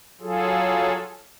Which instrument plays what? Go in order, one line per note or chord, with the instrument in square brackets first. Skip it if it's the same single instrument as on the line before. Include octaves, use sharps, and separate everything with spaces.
[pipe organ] F#3 F4 G#4 A4